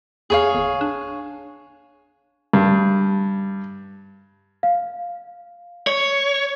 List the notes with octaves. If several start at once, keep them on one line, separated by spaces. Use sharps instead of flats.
E2 G#4 C#5 F5
G1
D4
G2
F5
C#5